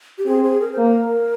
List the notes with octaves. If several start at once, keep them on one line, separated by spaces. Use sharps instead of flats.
G4
C4 G#4
G#4
A#4
C5
A#3
A#4